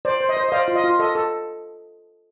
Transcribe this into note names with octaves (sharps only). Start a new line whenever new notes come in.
C5 D5
C5
D#5
C5
D#5
C5 D5 F5
F4
D#5
F4
A4 D#5
A4